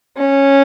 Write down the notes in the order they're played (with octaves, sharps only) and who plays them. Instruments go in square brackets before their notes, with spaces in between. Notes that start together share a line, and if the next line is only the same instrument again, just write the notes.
[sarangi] C#4